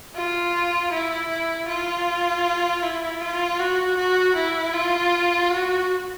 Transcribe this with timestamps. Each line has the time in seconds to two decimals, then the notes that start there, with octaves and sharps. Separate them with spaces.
0.16 F4
0.92 E4
1.68 F4
2.83 E4
3.21 F4
3.60 F#4
3.97 F#4
4.36 E4
4.74 F4
5.51 F#4